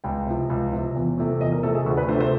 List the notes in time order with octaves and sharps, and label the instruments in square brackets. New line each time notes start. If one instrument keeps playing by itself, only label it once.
[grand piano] C#2 G5
C3 F3
C#2
C3 F3
E2
C3 F3 A3
E2 D#5
A#4
C3 F3 A3 A4
G#4
D2 F#4
B4
C3 F3 A3 D4 C5
C5